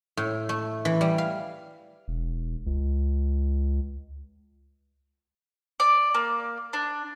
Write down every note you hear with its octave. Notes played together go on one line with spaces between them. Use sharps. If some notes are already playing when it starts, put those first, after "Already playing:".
A2
A3
E3
G3
F5
E1
C#2
D5
A#3
D4